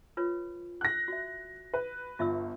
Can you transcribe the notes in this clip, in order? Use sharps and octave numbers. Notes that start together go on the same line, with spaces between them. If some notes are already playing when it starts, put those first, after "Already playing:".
F4 B4 C#5
F#6 A#6
F#4 E5
B4
G1 F4 E5 E6